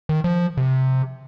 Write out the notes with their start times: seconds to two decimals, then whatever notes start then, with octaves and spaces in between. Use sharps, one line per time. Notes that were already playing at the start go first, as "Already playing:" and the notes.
0.09 D#3
0.24 F3
0.57 C3